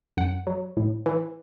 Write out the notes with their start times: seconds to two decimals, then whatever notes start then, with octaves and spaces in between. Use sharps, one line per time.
0.17 F#2 F#5
0.47 F#3
0.77 A2
1.06 E3